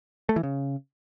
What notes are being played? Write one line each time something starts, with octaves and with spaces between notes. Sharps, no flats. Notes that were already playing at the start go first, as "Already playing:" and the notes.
A3
E3
C#3